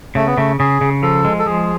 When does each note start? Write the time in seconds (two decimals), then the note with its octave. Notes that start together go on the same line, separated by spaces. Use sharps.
0.15 C#3 A3
0.27 B3
0.37 C#3 A3
0.59 C#3 G#4
0.81 C#3
1.03 F3 A4
1.25 G#3
1.39 A4
1.46 F3 G#4